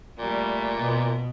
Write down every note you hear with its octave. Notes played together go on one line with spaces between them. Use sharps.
A#2 G3 A3
B2 B3